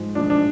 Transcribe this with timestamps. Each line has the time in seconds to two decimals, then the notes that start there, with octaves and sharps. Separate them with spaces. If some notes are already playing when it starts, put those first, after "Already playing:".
Already playing: G#2 F3
0.15 G#2 F3 D4
0.30 D4